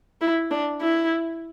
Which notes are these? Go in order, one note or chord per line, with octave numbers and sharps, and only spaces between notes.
E4
D4
E4